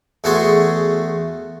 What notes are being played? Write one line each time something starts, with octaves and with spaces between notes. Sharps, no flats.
E2 A3 F#4 G#4 A5 C6